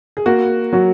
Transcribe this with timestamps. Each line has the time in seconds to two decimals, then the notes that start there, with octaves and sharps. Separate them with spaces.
0.17 G#4
0.26 A#3 F#4
0.73 F#3 F#4